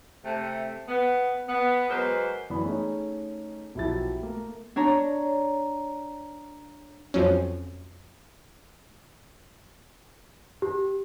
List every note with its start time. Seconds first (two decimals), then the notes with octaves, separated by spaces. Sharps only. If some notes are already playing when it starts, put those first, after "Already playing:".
0.25 C3 A3
0.88 B3
1.49 B3
1.90 F#3 G#3 A#3 B4 C5
2.50 F#2 E3 B3 D5 B5
2.63 A3 C#4 D#4 G#4
3.75 B1 F3 E4 F#4 G4 A6
4.22 A3 A#3
4.76 D4 C#5 A#5
7.14 F2 F3 F#3 C#4
10.62 G4